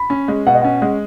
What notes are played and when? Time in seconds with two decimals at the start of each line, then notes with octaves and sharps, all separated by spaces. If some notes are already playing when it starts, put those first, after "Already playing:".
Already playing: B5
0.10 C#4
0.28 G#3
0.47 B2 F#5
0.55 D#5
0.62 C#4 F#5
0.82 G#3